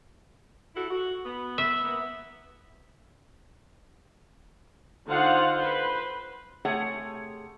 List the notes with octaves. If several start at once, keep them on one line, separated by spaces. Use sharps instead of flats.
E4 F#4 A4
F#4
B3
E5
A#3 B3
D3 D#4 F4 C5 F5 F#5
B4 C5
C3 A3 G#4 C#5 F#5